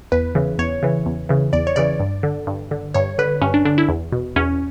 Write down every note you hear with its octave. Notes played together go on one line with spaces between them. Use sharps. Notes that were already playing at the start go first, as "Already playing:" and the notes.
E2 B4
C#3 E3
E2 C#5
C#3 E3
E2
C#3 E3
E2 D5
C#5
C#3 E3 D5
G2
D3
G2
D3
G2 C#5
D3 B4
G2 C#4
D4
D3 D4
E4
E2
B2
E2 C#4